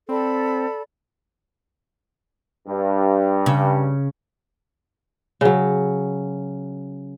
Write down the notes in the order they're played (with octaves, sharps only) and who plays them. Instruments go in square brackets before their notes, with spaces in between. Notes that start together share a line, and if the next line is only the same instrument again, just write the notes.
[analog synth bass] C4 [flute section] A4 D5 B5
[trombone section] G2
[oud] C#3
[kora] C#3 F#3